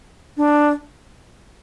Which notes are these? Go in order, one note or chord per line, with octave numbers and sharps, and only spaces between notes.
D4